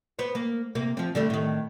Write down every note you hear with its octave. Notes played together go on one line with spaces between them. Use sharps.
B3 C5
A#3
C3 A#3
F3 C4
D3 G3 A3
A2 D#3